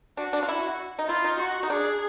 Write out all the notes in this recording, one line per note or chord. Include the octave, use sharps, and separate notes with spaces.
D4 F#4
D4
F4
E4 F#4
D#4
E4 F4
D#4
F#4
D#4
D4 G#4